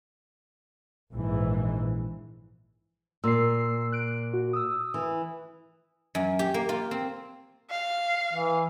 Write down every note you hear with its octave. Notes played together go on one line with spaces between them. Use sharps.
A#1 G#2 E3
A#2 E6 C7
F#6 D7
F#4
D#6 E6
E3
F#2
G4
A#3
F4
C4
F5
E3